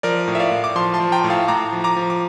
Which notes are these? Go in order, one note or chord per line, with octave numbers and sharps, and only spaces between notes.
F3 A#4 D5
A2
E5
D5 F5
A2
D6
F3 A5 C6
A5 C6
F3
G5 A#5
A2
F5 A5
A2 A#5 D6
F3
A#5 D6
F3
D6